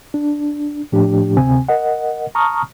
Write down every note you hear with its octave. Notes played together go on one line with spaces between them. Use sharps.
D4
A2 F3 A3 D4 G4
D2 C3 C4 G#5
A#4 D#5 F#5
A5 A#5 C#6 D#6 F6